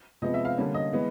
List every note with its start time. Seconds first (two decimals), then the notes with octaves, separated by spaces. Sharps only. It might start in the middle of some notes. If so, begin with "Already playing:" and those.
0.22 C3 F3 G#3 B3 D#5
0.34 E5
0.45 F5
0.58 D3 G3 A#3 C#4
0.74 D#5
0.93 E3 G#3 B3